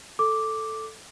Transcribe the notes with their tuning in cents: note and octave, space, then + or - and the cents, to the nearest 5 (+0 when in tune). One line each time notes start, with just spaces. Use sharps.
A4 +0 D6 +0